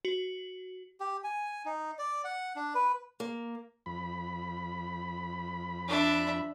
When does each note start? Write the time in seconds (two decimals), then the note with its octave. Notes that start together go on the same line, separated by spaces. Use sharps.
0.05 F#4
1.00 G4
1.24 G#5
1.65 D#4
1.99 D5
2.25 F#5
2.56 D4
2.75 B4
3.20 A#3
3.86 F2 B5
5.88 D4 E5